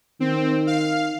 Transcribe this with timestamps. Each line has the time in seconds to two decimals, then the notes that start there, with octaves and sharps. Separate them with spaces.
0.20 D#3 C4
0.67 F5